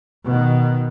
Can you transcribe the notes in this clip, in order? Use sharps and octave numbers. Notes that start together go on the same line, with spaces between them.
B2 D#3